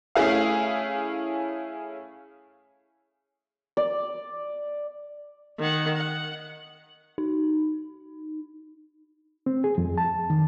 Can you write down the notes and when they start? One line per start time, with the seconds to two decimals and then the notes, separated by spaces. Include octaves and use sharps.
0.15 A3 C#4 E4 G#4 F5
3.77 D5
5.59 D#3 F#5
5.96 F#5
7.18 D#4
9.46 C4
9.64 G#4
9.78 F2
9.98 A5
10.30 D#3